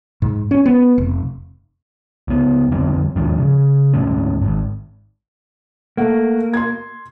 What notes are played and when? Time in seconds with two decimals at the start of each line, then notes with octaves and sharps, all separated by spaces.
0.22 G#2
0.51 C#4
0.66 B3
0.98 F1
2.28 C#2 B3
2.72 F2 D3 G3 C4
3.16 D#2 G#2 F3 D4
3.40 C#3
3.93 D2 G#2 A3 C#4
4.42 G#1 G#2
5.97 A3 A#3 F#5
6.53 C6 G#6